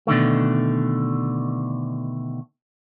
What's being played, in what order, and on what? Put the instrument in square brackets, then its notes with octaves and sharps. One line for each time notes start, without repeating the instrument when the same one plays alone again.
[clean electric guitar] B2 D3 D#3 A3